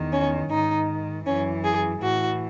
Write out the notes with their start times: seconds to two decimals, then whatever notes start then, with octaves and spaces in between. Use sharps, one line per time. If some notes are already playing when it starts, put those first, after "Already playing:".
Already playing: E2 D#3
0.12 C#4
0.49 G#2 D#3 D#4
1.25 F#2 E3 C#4
1.64 G#4
2.01 A2 E3 F#4